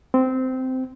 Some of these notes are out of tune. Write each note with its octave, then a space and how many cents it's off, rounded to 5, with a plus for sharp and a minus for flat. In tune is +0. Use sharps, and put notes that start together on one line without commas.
C4 -15